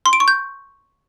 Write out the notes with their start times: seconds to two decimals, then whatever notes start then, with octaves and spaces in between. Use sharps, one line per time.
0.06 C6
0.13 D7
0.20 C#6
0.28 G6